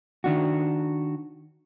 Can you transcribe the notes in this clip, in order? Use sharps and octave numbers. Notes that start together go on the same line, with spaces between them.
D#3 D4 F#4